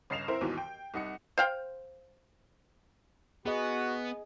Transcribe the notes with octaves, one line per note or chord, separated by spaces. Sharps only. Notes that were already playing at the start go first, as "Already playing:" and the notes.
G1 C#3 D#5 C7 E7 F7
C4 E4 A#4 C5
D#2 G#2 B2 E3
G5
C2 D#4 F#5 C#7
C5 F5 G5
B3 F#4 G#4 D#5